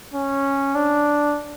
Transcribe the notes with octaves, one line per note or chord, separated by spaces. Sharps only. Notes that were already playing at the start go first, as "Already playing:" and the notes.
C#4
D4